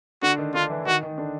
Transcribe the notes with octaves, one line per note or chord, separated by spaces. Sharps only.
D3 D4 F#4
D#3 D#4
D3 D4 F4
E3 E4
D#3 D#4 F#4
D#3 D#4
D3 D4